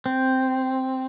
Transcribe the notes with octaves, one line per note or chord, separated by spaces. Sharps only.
C4